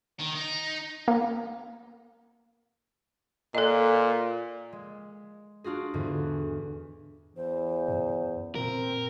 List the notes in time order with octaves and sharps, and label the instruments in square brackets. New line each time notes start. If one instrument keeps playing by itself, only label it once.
[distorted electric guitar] D#3
D#4
[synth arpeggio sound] A#3
[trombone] A#2 [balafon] A4 D#5
[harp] G#3
D4 F4 F#4 G#4
E2 G#2 D3
[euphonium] E2 [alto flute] C5
[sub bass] F#2
[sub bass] A#2 [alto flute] C4 [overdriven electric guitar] A#4